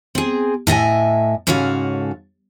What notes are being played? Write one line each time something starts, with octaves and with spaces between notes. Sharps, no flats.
C4 G#4
A2 D#5 E5 G#5
G#2 C#3 C#4 F#4 A4 F5